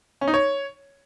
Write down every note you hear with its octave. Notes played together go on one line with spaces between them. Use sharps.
C#4
D#4
C#5